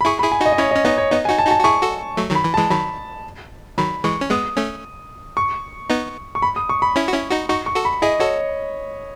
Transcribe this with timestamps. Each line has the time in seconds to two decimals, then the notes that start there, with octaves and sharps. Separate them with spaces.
0.01 B5
0.05 E4 G#4 C#6
0.19 B5
0.23 E4 G#4
0.32 G#5
0.41 D#4 F#4 D#5
0.52 D#5
0.58 C#4 E4 C#5
0.71 D#5
0.76 C#4
0.85 B3 D#4 D#5
0.98 C#5
1.11 B3 D#4 D#5
1.25 G#5
1.29 D#4 F#4
1.38 A5
1.47 D#4 F#4
1.51 A5
1.59 F#4
1.64 E4 G#4 C#6
1.82 F#4 A4
2.17 F#3 A3
2.31 D#3 F#3 B5
2.44 E3
2.54 A5
2.57 E3 G#3
2.71 D#3 F#3 B5
3.78 D#3 F#3 B5
4.04 E3 G#3 C#6
4.21 C#4
4.30 G#3 B3 D#6
4.57 A3 C#4
5.37 C#6
5.90 B3 D#4
6.35 C#6
6.42 B5
6.56 D#6
6.69 C#6
6.82 B5
6.96 C#4 E4
7.08 F#4
7.13 C#4 E4
7.31 D#4 F#4
7.49 D#4 F#4 C#6
7.66 C#6
7.76 F#4 A4
7.85 B5
8.02 E4 G#4 D#5
8.20 F#4 A4 C#5